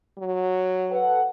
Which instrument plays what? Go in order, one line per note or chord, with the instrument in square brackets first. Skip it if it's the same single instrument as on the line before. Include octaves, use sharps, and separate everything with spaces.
[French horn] F#3
[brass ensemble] A4 B4 F#5